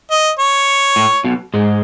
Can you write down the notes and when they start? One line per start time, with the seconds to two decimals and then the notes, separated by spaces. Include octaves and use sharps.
0.11 D#5
0.39 C#5
0.96 A2
1.24 B1 B2
1.54 G#2 G#3